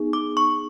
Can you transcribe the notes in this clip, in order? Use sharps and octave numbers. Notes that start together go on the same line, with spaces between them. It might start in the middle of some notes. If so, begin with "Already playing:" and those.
Already playing: B3 D#4 G#4
D6
C#6